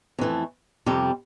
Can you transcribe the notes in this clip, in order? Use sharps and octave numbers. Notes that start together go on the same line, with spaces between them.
F2 E3 A3
F2 C3 G3